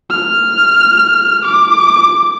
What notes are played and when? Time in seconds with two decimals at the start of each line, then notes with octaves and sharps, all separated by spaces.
0.10 F6
1.45 D6